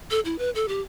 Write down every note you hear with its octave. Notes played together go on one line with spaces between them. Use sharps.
A4
E4
B4
A4
G4